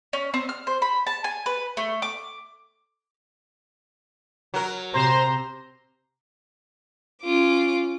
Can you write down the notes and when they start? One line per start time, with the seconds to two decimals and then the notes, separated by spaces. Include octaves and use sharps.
0.13 C#4
0.34 C4
0.49 F6
0.67 C5
0.82 B5
1.07 A5
1.24 G#5
1.46 B4
1.77 A3
2.02 D6
4.54 F#3 A#4
4.94 C3 C5 A#5 C6
7.23 C#4 F4 D6